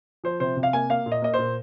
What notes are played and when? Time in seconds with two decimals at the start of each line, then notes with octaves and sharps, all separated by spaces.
0.24 F3 C5
0.40 C3 C5
0.57 C3
0.63 F5
0.73 A#3 G#5
0.90 A#3 F5
1.06 A#2
1.12 D#5
1.22 A#3 D#5
1.34 A#2 C5